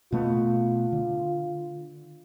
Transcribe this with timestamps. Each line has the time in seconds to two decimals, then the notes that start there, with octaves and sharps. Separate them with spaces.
0.12 B2 A3 B3 F4
0.92 D3